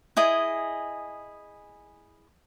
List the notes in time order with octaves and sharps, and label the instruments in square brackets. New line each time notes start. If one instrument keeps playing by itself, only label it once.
[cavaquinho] E4 G#4 D#5 G#5